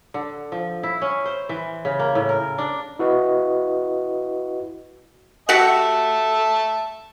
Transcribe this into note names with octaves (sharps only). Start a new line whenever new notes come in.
D3
F3
E4
C#4
C5
E3
C#3
A#3
A2
A#4
D4
E4 F#4 B4 D#5
F#4 G4 E5 F#5 A5